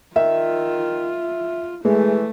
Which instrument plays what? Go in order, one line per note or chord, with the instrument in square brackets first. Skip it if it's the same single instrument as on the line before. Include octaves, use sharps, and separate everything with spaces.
[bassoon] D#3 [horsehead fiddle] F4 [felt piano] E5
[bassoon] E3 [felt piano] G#3 [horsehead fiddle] A3